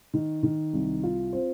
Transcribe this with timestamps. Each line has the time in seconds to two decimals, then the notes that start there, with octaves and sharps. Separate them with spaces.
0.14 D#3
0.43 D#3
0.73 C2
1.03 F4
1.33 C4